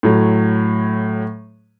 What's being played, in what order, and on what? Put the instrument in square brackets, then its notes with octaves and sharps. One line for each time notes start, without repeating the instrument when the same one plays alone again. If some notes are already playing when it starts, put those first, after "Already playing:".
[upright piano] A2 F#3